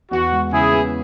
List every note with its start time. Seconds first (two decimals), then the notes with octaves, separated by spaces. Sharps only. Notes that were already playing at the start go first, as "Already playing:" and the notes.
0.11 E2 F#4
0.32 G#3
0.52 C#3 E4 G#4
0.72 B3